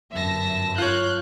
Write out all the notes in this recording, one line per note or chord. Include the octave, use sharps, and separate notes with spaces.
G1 F#2 E5 A5 A#6
F4 C#5 F#6 G6